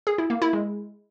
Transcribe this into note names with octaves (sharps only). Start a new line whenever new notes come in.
G#4
E4
A#3
E4
G#3